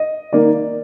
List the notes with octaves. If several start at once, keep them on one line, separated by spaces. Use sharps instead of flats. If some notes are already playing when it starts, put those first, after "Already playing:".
Already playing: D#5
D#3 A#3 D5